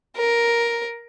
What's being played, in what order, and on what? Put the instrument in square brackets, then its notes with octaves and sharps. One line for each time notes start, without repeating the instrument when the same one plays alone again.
[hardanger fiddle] A#4